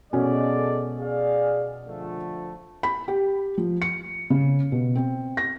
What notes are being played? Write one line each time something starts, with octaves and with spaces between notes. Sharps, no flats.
B2 G#3 C#4 A4 D5
G#4 D5 F5
D3 F3 A3
B5
G4
F3
C#7
C#3
B2
C4
A#6